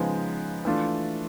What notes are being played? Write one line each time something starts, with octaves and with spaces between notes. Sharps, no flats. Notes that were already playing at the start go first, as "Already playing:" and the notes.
Already playing: C#3 F3 G#3 B3 D#4
E3 A3 D4 F4